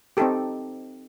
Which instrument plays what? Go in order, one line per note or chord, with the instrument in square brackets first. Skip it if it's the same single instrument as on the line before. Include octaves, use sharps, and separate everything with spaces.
[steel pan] C4 D#4 G4 A4